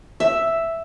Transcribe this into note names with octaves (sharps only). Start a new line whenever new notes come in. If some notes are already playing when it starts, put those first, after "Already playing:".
E5